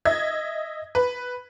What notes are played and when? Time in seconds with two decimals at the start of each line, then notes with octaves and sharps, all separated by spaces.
0.05 D#5 E5 G#6
0.95 B4